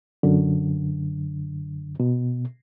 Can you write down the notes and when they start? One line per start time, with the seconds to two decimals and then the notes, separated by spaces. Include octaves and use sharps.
0.23 F#2 D3
2.00 B2